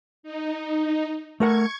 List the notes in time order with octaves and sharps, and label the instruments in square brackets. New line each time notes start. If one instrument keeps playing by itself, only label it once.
[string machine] D#4
[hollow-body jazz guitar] A3 A#4 F#5 [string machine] C#6 G#6